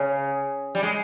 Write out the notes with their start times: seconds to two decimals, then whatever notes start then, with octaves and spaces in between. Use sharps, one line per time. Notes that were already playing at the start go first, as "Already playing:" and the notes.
Already playing: C#3
0.75 G3
0.83 G#3